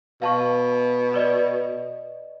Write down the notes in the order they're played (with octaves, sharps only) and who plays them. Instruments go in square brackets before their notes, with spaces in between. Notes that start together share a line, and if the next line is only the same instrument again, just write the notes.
[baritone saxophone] B2 [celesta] F5 A5 C#6
[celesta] B4 D5 D#5